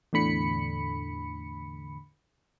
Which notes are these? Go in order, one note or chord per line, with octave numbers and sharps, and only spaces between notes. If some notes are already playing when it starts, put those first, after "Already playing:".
E2 A2 D3 B5 C#7